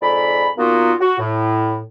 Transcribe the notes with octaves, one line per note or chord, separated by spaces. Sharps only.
F2 G#2 D5 B5
A#2 A#3 B3 D#4 F4 F#4
F#4
A2